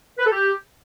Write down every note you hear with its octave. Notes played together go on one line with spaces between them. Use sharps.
B4
A4
G4